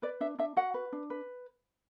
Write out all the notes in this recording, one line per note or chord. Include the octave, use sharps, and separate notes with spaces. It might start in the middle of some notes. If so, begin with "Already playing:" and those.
B4 D5
D4 E5
D4 E5
F#4 F#5
B4
D4
B4